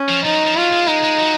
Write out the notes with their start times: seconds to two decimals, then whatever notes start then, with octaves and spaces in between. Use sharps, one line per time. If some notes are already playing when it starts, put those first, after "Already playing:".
Already playing: C#4
0.09 F3
0.25 F3 D#4
0.35 F#3
0.46 F3
0.56 F#3 F4
0.72 G#3
0.87 G#3 D#4
1.04 G#3
1.18 F#3